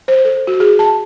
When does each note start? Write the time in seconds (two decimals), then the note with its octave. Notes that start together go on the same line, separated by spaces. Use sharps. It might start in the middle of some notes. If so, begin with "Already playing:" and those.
0.08 C5
0.25 A4
0.47 F#4
0.60 G#4
0.79 A5